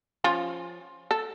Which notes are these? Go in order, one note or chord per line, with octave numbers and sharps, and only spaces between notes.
F3 C#4 F4
A4